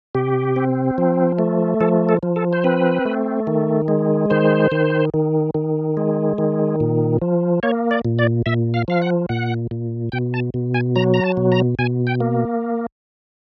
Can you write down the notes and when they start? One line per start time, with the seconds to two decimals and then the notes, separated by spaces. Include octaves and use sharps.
0.15 C3 G4
0.56 C4
0.98 F3
1.39 A3
1.81 F3 A4
2.09 A4
2.23 F3
2.36 A4
2.53 C5
2.64 C4 B4
3.05 A3
3.47 D#3
3.88 G#3
4.30 D#3 C5
4.72 D#3
5.14 D#3
5.54 D#3
5.97 G#3
6.38 D#3
6.80 A#2
7.22 F3
7.63 A#3 C#5
7.91 D5
8.05 A#2
8.19 D5
8.46 A#2 E5
8.74 F5
8.88 F3 F5
9.02 F#5
9.29 A#2 F#5
9.71 A#2
10.12 B2 G5
10.34 A5
10.54 B2
10.74 G#5
10.96 F#3 A#5
11.14 A#5
11.24 A5
11.37 B2
11.52 A#5
11.79 B2 G#5
12.07 G5
12.20 A#3